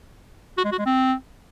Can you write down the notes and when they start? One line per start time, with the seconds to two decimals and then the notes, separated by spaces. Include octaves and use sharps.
0.58 F#4
0.65 G#3
0.72 F#4
0.79 G#3
0.86 C4